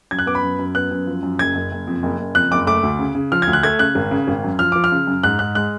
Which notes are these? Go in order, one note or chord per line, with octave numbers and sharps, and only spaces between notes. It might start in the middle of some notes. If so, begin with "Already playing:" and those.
F#2 G#6
F#6
B3 D6
B5
F#2
F#2
B3 F#6
F#2
F3
F#2
F#1 G#6
F#1
F#1
F2
F#1
F#1
F2 F#6
F#1 D6
A3 D6
D2
C#3
C#3
F3 F6
G#6
D2
F#6
A3 G#6
C#3 F#6
G#1
C#3
G#1
F#2
F3 F6
F3 D6
F6
C#3
F#2
G#2 F#6
G#2 F#6
G#3 F#6